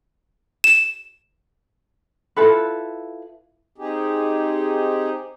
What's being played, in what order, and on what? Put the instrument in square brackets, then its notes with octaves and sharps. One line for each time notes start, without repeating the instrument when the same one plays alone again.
[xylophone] E7
[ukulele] E4 F4 A4 B4
[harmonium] C4 D#4 G4 G#4